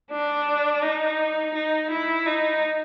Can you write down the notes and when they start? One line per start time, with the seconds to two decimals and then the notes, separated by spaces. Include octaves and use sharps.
0.11 D4
0.82 D#4
1.54 D#4
1.90 E4
2.26 D#4